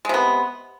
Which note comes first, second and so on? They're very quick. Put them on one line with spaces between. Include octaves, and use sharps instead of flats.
G#3 C3 B3